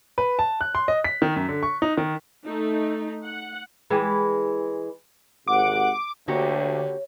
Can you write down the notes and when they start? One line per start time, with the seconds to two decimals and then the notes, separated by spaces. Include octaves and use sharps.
0.18 B4
0.39 A5
0.61 F#6
0.75 C6
0.88 D#5
1.04 B6
1.22 D#3
1.36 F#2
1.49 D3
1.63 C#6
1.82 D#4
1.97 D#3
2.45 A3 D#4
3.25 F#5
3.90 E3 G#3 G4
5.48 G#1 C3 F#5 D6
6.28 D2 D3 A#3 F#4 G4 C#5